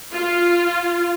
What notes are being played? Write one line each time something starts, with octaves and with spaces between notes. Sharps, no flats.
F4